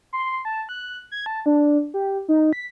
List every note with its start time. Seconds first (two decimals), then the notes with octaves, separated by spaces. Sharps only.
0.13 C6
0.45 A5
0.69 F#6
1.12 G#6
1.26 A5
1.46 D4
1.94 G4
2.28 D#4
2.53 B6